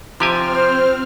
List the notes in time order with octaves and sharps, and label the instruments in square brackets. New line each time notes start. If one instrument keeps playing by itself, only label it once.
[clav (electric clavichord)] C3 G4 G#5 [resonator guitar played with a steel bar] F3 [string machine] C4 F6
[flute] C5